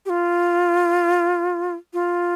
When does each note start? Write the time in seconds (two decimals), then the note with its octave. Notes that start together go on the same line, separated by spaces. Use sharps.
0.06 G4
0.10 F4
1.93 F4